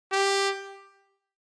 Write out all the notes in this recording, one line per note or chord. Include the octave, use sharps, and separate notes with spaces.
G4